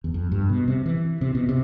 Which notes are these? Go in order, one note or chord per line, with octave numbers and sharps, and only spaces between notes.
E2
F2
G2
B2
C3
E3
C3
B2
C3